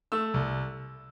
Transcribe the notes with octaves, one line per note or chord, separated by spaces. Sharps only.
A3 E6
C2